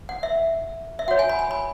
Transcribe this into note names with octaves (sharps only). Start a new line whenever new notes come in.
F#5
E5
E5
F#4 C#5 F#5
G#5
B5
G#5
B5